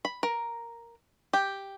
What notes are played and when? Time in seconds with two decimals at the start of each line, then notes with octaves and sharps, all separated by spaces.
0.05 B5
0.23 A#4
1.33 G4